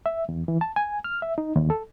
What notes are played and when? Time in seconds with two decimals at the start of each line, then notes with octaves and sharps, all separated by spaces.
0.06 E5
0.29 E2
0.48 E3
0.61 A5
0.76 G#5
1.04 F6
1.22 E5
1.38 D#4
1.56 D#2
1.70 A4